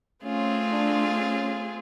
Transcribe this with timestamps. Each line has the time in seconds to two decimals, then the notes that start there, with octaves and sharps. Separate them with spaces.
0.23 A3 C4 C#4 F4 G#4
0.72 D4
1.19 C#4